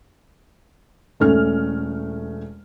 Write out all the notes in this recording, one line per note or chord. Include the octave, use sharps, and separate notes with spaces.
E1 A3 C#4 F6